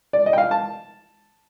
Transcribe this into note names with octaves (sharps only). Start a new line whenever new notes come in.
D5
D#5
G5
F5
A5